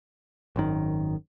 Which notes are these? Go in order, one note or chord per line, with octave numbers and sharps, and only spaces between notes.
G#1 F#2 D#3